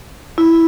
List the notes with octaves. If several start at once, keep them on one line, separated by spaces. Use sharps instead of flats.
E4